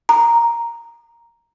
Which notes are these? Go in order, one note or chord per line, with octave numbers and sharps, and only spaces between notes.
A#5